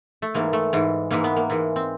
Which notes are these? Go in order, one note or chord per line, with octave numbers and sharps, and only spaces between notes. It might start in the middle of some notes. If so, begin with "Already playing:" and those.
A3
G#2 E3 G#3 A#3
A3
G#2 E3 G#3
G#2 E3 G#3 A#3
B3
A#3
G#2 E3 G#3
C4